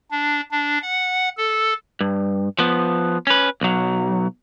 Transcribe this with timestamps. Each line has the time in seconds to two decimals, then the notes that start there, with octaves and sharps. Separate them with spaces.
0.11 D4
0.51 D4
0.82 F#5
1.37 A4
2.01 G2
2.59 F3 B3
3.27 C#4 B4
3.61 B1 F#3